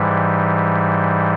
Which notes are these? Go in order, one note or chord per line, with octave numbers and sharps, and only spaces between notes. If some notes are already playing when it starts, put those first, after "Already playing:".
Already playing: G#2 E3 G3